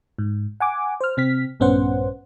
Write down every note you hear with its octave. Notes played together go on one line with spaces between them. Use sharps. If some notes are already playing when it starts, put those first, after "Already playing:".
G#2
F#5 G#5 D6
C5 F6
C3 C4 F6 B6
A#1 G2 B3 C#4 C5 F#5